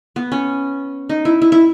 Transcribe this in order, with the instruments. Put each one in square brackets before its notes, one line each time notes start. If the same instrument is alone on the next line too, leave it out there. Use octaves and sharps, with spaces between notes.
[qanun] B3
C#4
D#4
E4
E4
E4